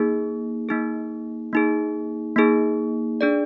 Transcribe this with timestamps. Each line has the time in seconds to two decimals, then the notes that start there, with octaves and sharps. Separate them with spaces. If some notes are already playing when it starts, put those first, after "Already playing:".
Already playing: A#3 D#4 G#4
0.69 A#3 D#4 G#4
1.53 A#3 D#4 G#4
2.36 A#3 D#4 G#4
3.21 D4 G#4 D5